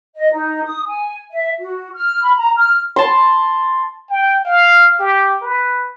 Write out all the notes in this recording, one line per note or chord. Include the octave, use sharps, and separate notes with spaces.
D#5
D#4
D#6
G#5
E5
F#4
F6
B5
A#5
F6
A5 C6
G5
F5
G4
B4